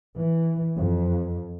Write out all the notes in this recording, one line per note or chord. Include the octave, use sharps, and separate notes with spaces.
E3
F2